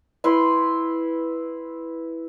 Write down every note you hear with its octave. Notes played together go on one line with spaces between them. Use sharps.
E4 B4 B5 C6